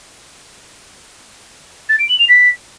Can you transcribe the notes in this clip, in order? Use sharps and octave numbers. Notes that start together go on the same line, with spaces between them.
A6
D7
F#7
F7
B6